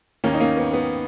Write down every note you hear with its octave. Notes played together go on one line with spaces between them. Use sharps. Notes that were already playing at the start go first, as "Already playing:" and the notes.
D#2 D#3 A#3 C#4
D#4
A#3 C#4
B3
B3